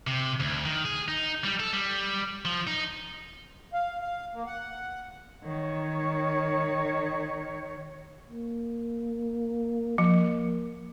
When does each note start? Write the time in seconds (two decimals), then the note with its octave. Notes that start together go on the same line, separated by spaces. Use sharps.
0.07 C3
0.40 D2
0.65 D#3
0.85 G#4
1.08 D#4
1.44 G3
1.60 A4
1.73 G3
2.45 F3
2.67 D#4
3.73 F5
4.01 F5
4.34 A#3
4.46 F#5
5.45 D#3 C#5
8.30 A#3
9.98 F3 A#3